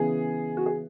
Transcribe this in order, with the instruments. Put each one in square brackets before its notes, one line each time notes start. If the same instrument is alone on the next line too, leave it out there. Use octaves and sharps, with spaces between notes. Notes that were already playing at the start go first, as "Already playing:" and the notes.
Already playing: [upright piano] C#3 E3 B3 G#4
F#4
G#4